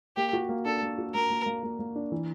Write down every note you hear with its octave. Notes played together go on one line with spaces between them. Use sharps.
A#3 G4
F#4
A#3
D4 A4
A#3
F#4
A#3 A#4
A#3
A#3
A#3
A#3
D4
E3